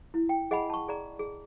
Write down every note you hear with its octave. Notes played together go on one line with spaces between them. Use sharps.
E4
G5
G#4 D#5 F#5 G#5 B5
A5 C#6
G#4 D5 A#5
G#4